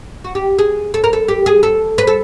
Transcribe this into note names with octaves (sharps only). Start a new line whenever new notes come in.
F#4
G4
G#4
A4
A#4
A4
G4
G#4
A4
B4
A4